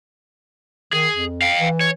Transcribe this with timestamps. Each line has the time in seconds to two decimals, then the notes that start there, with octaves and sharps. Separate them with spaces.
0.93 D#3 G#4
1.13 F2
1.42 F5 G5
1.59 E3
1.81 C#5